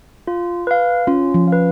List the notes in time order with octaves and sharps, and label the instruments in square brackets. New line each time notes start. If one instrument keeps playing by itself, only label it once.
[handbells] F4
B4 F5
[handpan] C#4 [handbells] F4
[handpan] F3
[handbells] F5
B4